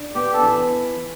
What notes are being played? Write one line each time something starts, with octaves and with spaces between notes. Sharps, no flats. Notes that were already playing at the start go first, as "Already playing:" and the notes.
Already playing: D4
B3 G4
A4
E3